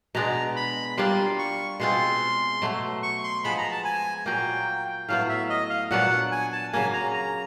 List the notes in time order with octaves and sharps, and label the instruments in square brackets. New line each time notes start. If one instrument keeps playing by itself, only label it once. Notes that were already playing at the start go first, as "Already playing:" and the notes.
[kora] B2 G#3 B3 D4 [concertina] A#5
[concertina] B5
[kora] G3 A#3 D4 F4 [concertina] C6
[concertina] C#6
[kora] B2 G#3 C4 F4 [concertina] C6
[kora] B2 F#3 A3
[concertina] C#6
C6
[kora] F3 G#3 B3 [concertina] B5
[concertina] A#5
A5
G#5
[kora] A#2 F#3 A#3 [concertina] G5
[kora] A2 F#3 B3 [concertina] F5
[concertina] E5
D#5
F5
[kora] A#2 F#3 B3 D4 [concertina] F#5
[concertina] G#5
A5
[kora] C#3 F#3 A#3 [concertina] G#5
[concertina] A#5
A#5